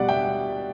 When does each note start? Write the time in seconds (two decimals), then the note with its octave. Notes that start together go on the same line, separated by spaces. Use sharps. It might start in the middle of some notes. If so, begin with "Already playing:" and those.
Already playing: B2 G3 D5 F#5
0.09 E5 G5